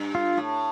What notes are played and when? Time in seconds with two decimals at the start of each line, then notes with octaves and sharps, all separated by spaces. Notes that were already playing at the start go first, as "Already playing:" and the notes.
Already playing: G2
0.15 F4
0.37 A2